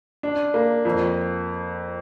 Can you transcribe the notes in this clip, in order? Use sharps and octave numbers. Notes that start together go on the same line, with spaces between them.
D4
A#3
F2